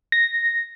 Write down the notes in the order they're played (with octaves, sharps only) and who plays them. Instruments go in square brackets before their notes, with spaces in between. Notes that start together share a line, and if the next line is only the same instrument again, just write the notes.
[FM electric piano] A#6